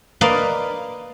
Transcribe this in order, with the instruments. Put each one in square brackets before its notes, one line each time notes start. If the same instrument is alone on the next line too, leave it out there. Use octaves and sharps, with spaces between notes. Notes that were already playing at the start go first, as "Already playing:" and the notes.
[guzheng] A#3 A#4 B4 D5 D#5 F5